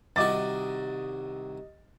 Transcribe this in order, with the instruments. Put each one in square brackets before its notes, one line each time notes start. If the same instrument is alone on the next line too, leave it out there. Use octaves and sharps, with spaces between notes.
[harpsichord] C2 D#3 F#4 [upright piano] D#5 D6 A6